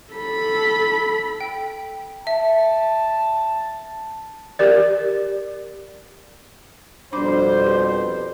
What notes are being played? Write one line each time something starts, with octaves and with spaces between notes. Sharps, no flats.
A4 B5
G5
E5 A5
G4 A#4 D5
F2 B2 G3 D4 C5 B5 D6
G4 B4